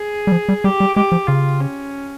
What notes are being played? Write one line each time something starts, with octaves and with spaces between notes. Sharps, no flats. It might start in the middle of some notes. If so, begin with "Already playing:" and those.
Already playing: G#4
G3
F3
G3
G3 G4
G3
G#3 G4
F3
C#3 F4
C#4